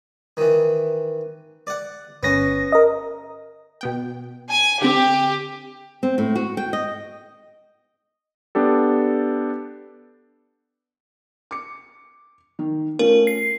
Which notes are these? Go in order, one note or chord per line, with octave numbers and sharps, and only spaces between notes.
D#3 E3
D5 F#5
G1 B3 C#4 A#6
A#4 D#5
B2 B3 G5
G#5
D3 C4 G4
C4
A2
F#4
G5
D#5
B3 D4 G4 A4
D6 C#7
D#3
A3 C#4 F4 A#4
C7